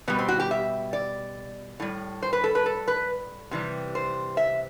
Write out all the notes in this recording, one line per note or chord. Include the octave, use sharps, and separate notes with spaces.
B2 G3 B3
C4
F#4
G4
E5
D5
A2 G3
C5
B4
A4
B4
A4
B4
C3 E3 G3
C5
E5